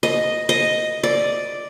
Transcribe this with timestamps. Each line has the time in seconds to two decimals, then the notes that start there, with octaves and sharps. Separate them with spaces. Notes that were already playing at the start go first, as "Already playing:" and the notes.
0.03 D#5
0.49 D#5
1.03 D5